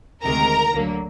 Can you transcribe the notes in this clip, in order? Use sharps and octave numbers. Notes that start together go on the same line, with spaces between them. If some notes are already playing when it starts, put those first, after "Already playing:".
D2 C3 D#3 G#3 A#4 A#5
D2 D3 F#3 A#3